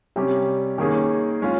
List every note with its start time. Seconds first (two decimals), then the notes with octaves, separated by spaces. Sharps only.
0.16 C3 G3 C#4 G4
0.78 D#3 A#3 C#4 G#4
1.42 G#3 C#4 F4